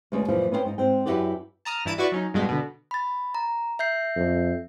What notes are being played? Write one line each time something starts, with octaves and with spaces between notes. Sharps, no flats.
D2 B2 G#3 B3 C#4
F#2 A#2 E3 F3
B3 C#4 C5 F5 G5
G#2 D#4
G#2 C4 G5
F#2 E4 F#4 G4 B4 D5
A5 A#5 D#6 F6
G2 E3 E4 A5 D7 D#7
E4 F#4 B4 D5 C#6
F#3 C#4 D#4
G2 B2 G#3
B2 D3
B5 A6
A#5
E5 G6 C7
F2